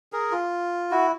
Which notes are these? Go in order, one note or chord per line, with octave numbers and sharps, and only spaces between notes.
G#4 A#4
F4
E4 F#4